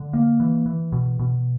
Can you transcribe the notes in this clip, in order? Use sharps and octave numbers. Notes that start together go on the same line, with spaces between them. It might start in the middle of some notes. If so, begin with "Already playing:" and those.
Already playing: D3
A#3
E3
E3
B2
B2